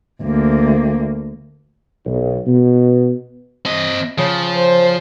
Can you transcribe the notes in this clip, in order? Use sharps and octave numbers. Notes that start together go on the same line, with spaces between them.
D2 A#3
B1
B2
C4 D#5
C#3 F3
C5